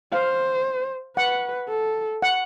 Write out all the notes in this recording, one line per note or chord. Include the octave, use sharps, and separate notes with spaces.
C5 F5
B4 F#5
A4
F#5